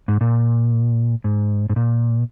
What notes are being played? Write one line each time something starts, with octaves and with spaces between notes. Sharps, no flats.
G#2
A#2
G#2
G#2
A#2